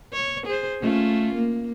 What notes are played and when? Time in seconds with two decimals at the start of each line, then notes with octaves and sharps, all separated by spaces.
0.13 C#5
0.46 G#4 C5
0.81 A3 C#4 F4
1.35 A#3